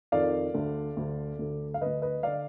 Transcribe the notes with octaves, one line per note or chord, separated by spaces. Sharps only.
F2 D#3 D5 F5
D2 D3
D2 D3
D2 D3
F5
D2 D3 B4 D#5
B4 D#5
D3 D5 F5